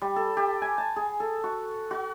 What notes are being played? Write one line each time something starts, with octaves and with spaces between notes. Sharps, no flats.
G3
A4
G4
G#5
A5
G#4
A4
F#4
F#4